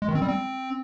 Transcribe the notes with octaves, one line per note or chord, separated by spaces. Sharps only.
G#3
D#3
C4
G3
C4